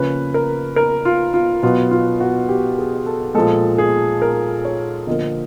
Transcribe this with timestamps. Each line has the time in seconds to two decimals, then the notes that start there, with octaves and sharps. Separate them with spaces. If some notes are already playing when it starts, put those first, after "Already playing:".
Already playing: C#3 F3 A#3 C#4 B4
0.34 A#4
0.76 A#4
1.05 F4
1.34 F4
1.63 B2 F#3 B3 F4
1.91 F4
2.20 F#4
2.49 G4
2.78 G#4
3.06 A4
3.35 A#2 F3 G#3 A4
3.78 G#4
4.22 A#4
4.65 C#5
5.07 D3 F3 A#3 D#5